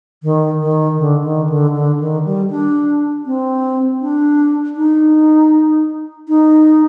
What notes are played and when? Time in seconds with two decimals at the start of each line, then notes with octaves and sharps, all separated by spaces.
0.23 D#3
0.61 D#3
0.99 D3
1.24 D#3
1.49 D3
1.75 D3
2.00 D#3
2.25 G3
2.50 D4
3.26 C4
4.01 D4
4.77 D#4
6.28 D#4